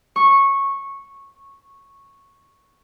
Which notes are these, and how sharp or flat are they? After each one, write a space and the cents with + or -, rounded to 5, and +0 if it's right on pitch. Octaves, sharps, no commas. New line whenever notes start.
C#6 -10